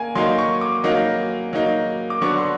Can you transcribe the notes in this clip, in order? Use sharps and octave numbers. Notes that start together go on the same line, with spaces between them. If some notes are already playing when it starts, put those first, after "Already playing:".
Already playing: A#3 G#5
F#3 A#3 D#4 C6
C#6
D6
F#3 A#3 D#4
F#3 A#3 D#4
D6
D3 F#3 B3 D4 C#6
C6